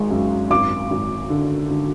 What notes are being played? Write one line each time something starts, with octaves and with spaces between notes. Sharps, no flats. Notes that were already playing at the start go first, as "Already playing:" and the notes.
Already playing: G#1 G#3
F#2
G#1 D6
G#1
D3
D3